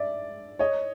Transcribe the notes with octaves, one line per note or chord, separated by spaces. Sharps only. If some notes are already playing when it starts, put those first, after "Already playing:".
Already playing: D5 E5
C#5 D#5